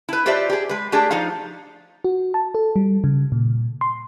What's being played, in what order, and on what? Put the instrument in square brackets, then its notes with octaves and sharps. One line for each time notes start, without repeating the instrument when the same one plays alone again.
[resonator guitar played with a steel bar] E4 B4
F4 G4 B4 C5 D5 E5
G4 G#4
G#3 B4
A3 D4 G4 G#4
F3 D#4 F4 F5
[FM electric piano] F#4
A5
A4
G3
C#3
A#2
C6